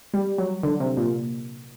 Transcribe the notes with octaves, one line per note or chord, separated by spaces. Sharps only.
G3
F#3
D3
C3
A#2